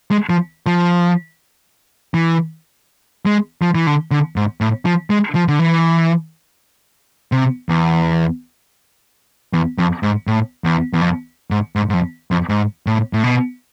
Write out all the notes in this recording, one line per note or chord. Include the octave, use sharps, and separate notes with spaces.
G#3
F3
F3
E3
G#3
F3
E3
D3
D3
G#2
A2
F3
G#3
F3
D3
E3
C3
E2
E2
F2
G#2
A2
E2
E2
F2
G#2
G#2
G#2
F2
F2
G#2
A2
A2
B2